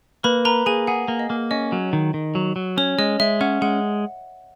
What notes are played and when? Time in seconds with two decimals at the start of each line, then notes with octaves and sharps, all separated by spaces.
0.24 A#3 B4 B5
0.45 A#4 B4 A#5
0.66 A#3 G#4 G#5
0.87 G#4 F#5
1.08 A#3
1.19 D#5
1.30 A#3
1.51 C#4 D#5
1.72 F#3
1.93 D#3
2.14 D#3
2.35 F#3
2.56 F#3
2.78 C#4 C#5
2.98 G#3 D#5
3.20 G#3 E5
3.41 C#4 F#5
3.62 G#3 F#5